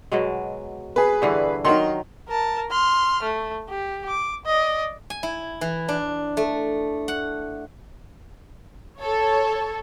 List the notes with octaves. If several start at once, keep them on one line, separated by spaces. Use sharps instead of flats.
B2 F#3 G#3
G#4 B4
G2 D3 E3
D#3 F#3 D#4 A#4 C6
A#4 A5
C6 F6
A3
G4
D6
D5 D#5
G#5
E4
E3
D4
A3
F#5
A4 C#5